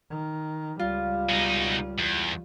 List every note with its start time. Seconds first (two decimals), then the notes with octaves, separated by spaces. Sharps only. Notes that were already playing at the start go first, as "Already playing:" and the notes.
0.10 D#3
0.79 C#2 G3 F4
1.29 B2 D#4
1.98 E2